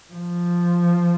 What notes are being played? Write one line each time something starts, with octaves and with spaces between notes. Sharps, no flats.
F3